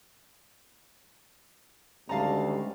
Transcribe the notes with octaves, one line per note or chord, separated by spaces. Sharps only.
D2 D#3 G3 G#3 C#4 F5 A5 A#5